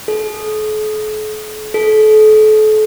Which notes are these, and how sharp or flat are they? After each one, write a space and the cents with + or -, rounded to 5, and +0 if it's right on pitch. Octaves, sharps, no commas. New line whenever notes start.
A4 -45
A4 -35